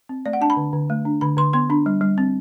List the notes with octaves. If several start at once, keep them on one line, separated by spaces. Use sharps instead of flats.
C4
A3 D5
F#5
D4 A5
B5
D3
D3
A3
D4
D3 B5
D3 C6
B3 C6
D4 B5
G3
G3
C4